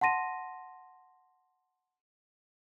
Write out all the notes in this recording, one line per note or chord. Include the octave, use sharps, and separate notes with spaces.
F#5 A5 C6 A#6 D#7